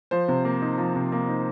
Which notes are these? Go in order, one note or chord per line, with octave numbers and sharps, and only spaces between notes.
F3 C5
C3
A#3
D#4
F3
C3
A#3
D#4